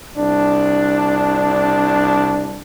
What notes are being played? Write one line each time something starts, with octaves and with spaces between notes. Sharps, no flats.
C2 D4